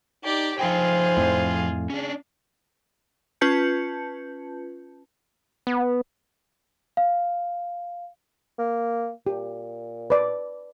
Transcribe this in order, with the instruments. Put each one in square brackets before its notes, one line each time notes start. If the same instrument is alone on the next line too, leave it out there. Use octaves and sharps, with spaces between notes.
[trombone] D#4 [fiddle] G4 D5
[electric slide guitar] F3 D#4 G5 [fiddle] F4 G#4 [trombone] C5
[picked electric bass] F2 A2
[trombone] C#3 [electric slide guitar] C#4 D4
[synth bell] C#4 F4 B4 A5 G6 C#7
[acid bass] B3
[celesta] F5
[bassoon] A#3
[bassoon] A#2 [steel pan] G4
[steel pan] B4 D5